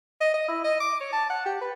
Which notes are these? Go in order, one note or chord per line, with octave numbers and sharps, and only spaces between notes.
D#5
D#5
E4
D#5
D6
C#5
A5
F#5
G4
B4